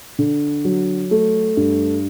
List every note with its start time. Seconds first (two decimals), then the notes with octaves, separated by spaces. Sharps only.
0.19 D3
0.65 F#3
1.11 A3
1.57 G2